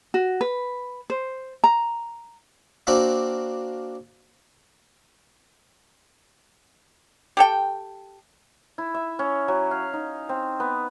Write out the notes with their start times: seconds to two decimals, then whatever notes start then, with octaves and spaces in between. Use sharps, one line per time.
0.14 F#4
0.41 B4
1.10 C5
1.64 A#5
2.87 A#3 C4 D4 F#4
7.37 G4 A4 G5
8.78 E4
8.94 E5
9.19 C#4
9.48 F#3
9.71 F5
9.93 D#4
10.29 C4
10.60 B3